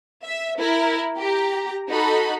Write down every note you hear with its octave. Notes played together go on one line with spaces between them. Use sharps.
E5
E4 A#4
G4 A#5
D#4 F#4 A4 B5